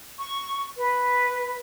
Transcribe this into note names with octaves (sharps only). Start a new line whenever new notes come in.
C#6
B4